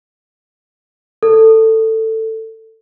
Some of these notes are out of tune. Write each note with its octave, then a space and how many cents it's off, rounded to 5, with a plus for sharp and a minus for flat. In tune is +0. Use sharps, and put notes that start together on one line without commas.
A4 +15